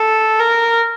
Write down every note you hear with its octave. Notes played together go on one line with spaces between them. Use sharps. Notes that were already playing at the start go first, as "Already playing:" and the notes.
Already playing: A4
A#4